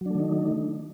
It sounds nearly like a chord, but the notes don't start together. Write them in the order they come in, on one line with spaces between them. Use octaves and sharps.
F#3 D4 A3 D#3 D#4